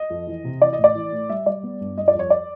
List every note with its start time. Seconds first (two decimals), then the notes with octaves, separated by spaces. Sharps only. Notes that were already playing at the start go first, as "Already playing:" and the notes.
Already playing: D#5
0.10 F2
0.27 E3
0.44 C3
0.61 E3 D5
0.73 D#5
0.78 A1
0.84 D5
0.95 E3
1.12 A2
1.30 G3 E5
1.46 G3 D5
1.63 B3
1.81 G2
1.97 G3 D#5
2.08 D5
2.15 F2 C#5
2.30 D5